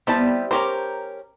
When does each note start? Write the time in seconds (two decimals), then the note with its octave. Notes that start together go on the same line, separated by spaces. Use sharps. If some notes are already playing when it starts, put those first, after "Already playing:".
0.07 G3 B3 C4 E4 A5
0.51 C#4 G4 A#4 C5 A#5